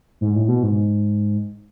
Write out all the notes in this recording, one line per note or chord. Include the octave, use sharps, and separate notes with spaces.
G#2
A2
B2
G#2